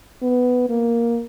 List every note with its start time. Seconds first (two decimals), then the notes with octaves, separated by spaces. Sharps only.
0.22 B3
0.69 A#3